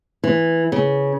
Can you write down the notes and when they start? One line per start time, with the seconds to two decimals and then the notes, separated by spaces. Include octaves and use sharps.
0.24 E3
0.72 C#3